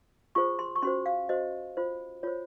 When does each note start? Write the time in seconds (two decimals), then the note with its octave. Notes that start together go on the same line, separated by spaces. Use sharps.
0.35 F4 G#4 C5 C#6
0.59 C6
0.75 C#6
0.82 C#4 F#4 C5 C6
1.06 F5
1.29 F#4 C5 D#5
1.77 F4 C5
2.23 F4 C5 C#5